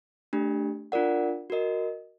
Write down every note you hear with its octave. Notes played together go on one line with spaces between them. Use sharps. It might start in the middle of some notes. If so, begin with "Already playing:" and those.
A3 D4 G4
D4 F4 A#4 D5 F#5
F#4 A#4 D#5